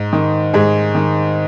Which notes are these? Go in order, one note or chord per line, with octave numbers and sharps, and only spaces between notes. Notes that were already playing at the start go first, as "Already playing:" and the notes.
Already playing: G#2
D#3
G#2 G#4
D#3